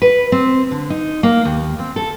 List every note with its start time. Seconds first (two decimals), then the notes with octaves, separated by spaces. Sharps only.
0.02 B4
0.32 C4
0.71 D3
0.90 D#4
1.23 A#3
1.45 D#2
1.79 C4
1.96 A4